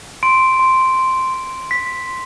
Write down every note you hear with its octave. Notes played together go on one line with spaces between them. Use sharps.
C6 D7
C6
C6
C6
C6 B6
C6